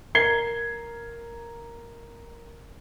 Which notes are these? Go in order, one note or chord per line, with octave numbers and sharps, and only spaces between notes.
A#4 G#6 C7 G7